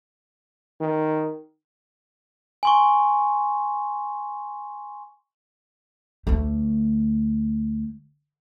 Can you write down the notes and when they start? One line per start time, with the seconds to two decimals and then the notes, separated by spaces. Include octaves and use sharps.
0.80 D#3
2.63 G#5 C6 C#6
6.27 D2 A3